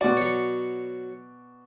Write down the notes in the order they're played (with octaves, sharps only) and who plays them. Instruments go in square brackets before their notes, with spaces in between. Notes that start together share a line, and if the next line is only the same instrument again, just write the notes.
[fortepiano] B2 D5 [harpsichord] F#4
[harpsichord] F#3 C#5